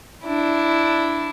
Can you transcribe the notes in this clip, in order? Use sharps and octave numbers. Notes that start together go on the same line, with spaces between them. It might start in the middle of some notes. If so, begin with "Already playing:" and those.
D4 E4